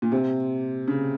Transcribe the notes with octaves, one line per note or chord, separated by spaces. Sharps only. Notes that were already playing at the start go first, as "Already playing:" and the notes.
A#2
C3
C#3